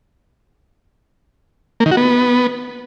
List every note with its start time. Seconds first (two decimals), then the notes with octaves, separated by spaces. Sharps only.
1.80 A#3
1.86 D#3
1.92 F#4
1.97 B3